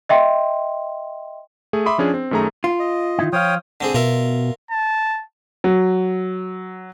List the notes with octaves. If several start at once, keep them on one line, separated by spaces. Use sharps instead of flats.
D#5 E5 G5 C6
A3 G#4
E5 B5 C6 D6 D#6
F3 C#4 D4 G#4
C4
F#2 D#3 A3 G#4 A#5
F4
D#5
D#3 D#4 E4
F3 C5 C#5 F5 G5 D#6
D3 C4 G#4
B2 F4 A#4 E5
A5
F#3